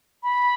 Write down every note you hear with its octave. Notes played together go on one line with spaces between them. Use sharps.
B5